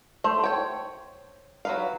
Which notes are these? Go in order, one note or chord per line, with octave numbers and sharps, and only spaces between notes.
A3 C5
C#5 G5
F#3 B4 F5